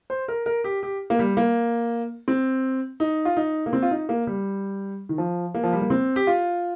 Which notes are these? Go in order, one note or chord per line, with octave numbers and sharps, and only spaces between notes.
C5
A#4
A#4
G4
G4
A#3
G3
A#3
C4
D#4
F4
D#4
A#3
C4
F4
D#4
A#3
G3
D#3
F3
A#3
F3
G3
A#3
C4
G4
F4